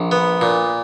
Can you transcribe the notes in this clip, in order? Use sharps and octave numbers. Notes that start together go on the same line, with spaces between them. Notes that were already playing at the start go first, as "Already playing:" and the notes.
Already playing: A#1
B3
A#2